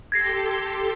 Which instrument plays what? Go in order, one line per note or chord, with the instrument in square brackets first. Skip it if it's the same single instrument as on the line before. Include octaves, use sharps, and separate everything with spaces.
[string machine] G4 A4 C6 [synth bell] G#6 A#6 C7